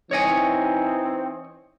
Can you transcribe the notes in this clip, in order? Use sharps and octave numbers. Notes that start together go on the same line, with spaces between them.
E3 C4 D#4 C#5 D#5 G#5